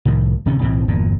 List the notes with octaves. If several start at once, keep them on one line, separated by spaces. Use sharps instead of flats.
C2 A2 D#3
D1 C3 D#3 C#4
B1 A2 E3 C4
G1 E2 A#2